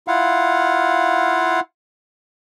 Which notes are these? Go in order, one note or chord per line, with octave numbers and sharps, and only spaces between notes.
E4 F4 F5 F#5